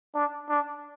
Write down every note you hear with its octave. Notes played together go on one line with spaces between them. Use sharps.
D4
D4